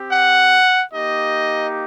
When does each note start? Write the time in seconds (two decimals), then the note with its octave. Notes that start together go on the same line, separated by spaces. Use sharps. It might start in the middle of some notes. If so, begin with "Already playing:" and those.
Already playing: C4 G4
0.12 F#5
0.93 A#3 D#4 G4 D#5